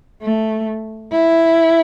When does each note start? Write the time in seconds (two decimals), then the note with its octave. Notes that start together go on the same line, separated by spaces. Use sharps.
0.22 A3
1.11 E4